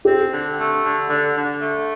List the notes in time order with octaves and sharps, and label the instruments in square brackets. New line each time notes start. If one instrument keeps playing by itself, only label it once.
[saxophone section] C4 [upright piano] G4
[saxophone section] D3
A3
D3
D3
D3
A3